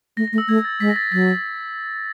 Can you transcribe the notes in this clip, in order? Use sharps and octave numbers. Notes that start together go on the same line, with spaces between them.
A3 A#6
A#6
A3
E6
A3 G#6
A6
G#3 B6
A#6
A6
F#3 A6